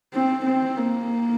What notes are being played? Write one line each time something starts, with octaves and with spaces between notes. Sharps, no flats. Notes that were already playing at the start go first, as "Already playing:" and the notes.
C4
C4
A#3